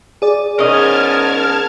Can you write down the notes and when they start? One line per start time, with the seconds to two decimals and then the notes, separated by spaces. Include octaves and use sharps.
0.22 G#4 D5
0.59 E2 G#2 C#4 A#4 D#5 A5 F6 G#6